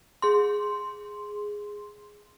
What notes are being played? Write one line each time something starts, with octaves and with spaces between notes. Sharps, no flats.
G#4 C6